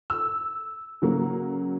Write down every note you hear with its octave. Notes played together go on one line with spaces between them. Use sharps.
E6
C#3 F#3 A#3